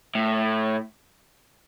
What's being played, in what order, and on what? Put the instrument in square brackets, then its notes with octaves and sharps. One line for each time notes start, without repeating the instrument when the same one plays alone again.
[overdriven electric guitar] A2